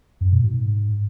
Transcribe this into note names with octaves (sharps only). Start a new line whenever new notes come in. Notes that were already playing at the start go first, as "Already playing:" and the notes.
F#2
B2
G#2